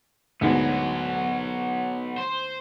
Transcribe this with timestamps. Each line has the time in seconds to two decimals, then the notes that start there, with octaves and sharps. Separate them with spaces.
0.41 D2 G#2 B2 F#3 B3
2.18 C5